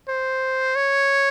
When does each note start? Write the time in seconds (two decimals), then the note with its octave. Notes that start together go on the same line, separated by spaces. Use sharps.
0.08 C5
0.76 C#5